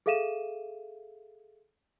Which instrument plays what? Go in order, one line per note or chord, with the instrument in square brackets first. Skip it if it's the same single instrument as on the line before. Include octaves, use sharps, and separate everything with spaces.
[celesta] G#4 A4 E5 F5 D#7 E7